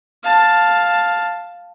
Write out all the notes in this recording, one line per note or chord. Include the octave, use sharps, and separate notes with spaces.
F5 A5